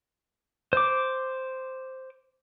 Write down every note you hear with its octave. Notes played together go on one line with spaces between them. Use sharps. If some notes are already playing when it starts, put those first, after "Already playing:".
C5 D6